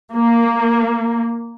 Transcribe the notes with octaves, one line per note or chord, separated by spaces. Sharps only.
A#3